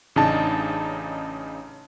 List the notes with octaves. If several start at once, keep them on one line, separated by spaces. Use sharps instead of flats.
A1 C#3 D4 D#4 A5